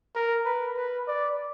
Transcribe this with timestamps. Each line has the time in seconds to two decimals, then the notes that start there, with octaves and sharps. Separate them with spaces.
0.15 A#4
0.45 B4
0.77 B4
1.07 D5